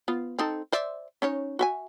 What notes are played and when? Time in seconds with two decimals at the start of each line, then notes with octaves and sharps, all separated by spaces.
0.08 B3 F4
0.39 C4 D#4 A4
0.72 C5 D5 E5
1.22 C#4 D#4 C#5
1.59 F#4 E5 G#5